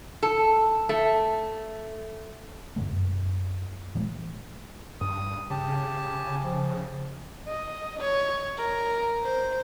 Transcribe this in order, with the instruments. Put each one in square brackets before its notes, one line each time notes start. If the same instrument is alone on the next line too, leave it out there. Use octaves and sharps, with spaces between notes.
[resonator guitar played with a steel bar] A4
A3
[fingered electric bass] G2 B2 D3 A3
F#2
A#2 E3 G#3 A3
[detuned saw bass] G2 [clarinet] D#6
[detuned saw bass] C#3 [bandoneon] G4 A5
[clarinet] G#5
F3
[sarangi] D#5
C#5
A#4
C5